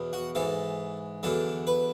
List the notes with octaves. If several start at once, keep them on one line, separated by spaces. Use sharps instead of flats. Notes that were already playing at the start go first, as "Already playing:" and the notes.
Already playing: E2 B2 F#3
F#4
G#2 E3 A4
E2 D3 F#3 A4
B4